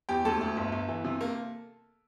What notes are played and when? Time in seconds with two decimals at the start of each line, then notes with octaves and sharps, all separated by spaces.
0.09 E2 G4 G5
0.25 D2 A4 A5
0.41 D2
0.57 G1
0.72 G1
0.88 E3
1.04 C3
1.21 A#3